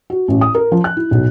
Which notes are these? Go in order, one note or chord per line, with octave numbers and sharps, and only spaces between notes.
F#4
A1
D#6
A#4
F3
F#6
E4
B1